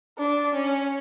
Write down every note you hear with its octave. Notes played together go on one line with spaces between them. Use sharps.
D4
C#4